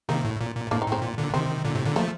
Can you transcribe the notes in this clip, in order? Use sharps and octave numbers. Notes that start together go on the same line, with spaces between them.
C3 D#3 A#3
A2
A#2
A#2
A2 A#3 D4
C4 D#4
A2
C4 D#4
A#2
A#2 D3
C3 D#3 C4
A#2 D3
A2 C3
A#2 D3
F3 A3 A#3